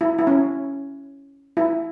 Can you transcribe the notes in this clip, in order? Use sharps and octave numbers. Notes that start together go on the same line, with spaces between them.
E4
E4
C#4
E4